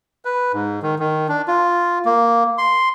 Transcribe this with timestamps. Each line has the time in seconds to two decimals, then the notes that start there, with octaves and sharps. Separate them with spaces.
0.25 B4
0.54 G#2
0.83 D#3
0.99 D#3
1.28 D4
1.48 F4
2.05 A#3
2.58 C6